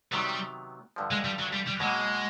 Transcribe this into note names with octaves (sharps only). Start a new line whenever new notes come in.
C3 D#3 F#3 G3 B3
G2 D3 F3
G#3
G3
F#3
G3
G3
B2 F#3 G#3 A#3